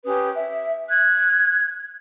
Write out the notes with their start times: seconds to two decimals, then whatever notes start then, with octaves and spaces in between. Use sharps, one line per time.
0.04 C#4 G4 B4 D#6
0.36 E5
0.90 F#6 G#6